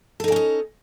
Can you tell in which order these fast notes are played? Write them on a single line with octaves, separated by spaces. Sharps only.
A4 D#4 D5 C#4 D#5